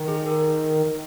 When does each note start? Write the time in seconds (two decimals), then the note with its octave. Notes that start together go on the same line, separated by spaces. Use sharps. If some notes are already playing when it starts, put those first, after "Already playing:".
Already playing: D#3
0.08 G#4
0.26 A#4